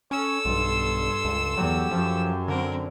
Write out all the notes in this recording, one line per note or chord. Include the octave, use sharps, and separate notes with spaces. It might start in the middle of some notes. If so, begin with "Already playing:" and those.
C#4 A4 C#5 E6
B1 G2 C6
C#2
E2 F#3 G4
F#2 F3
D3 C4 A#4